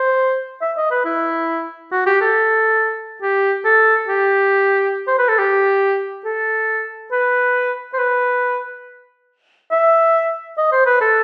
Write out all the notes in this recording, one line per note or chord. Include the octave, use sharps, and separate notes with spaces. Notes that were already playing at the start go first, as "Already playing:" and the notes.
Already playing: C5
E5
D#5
B4
E4
F#4
G4
A4
G4
A4
G4
C5
B4
A4
G4
A4
B4
C5
B4
E5
D#5
C5
B4
A4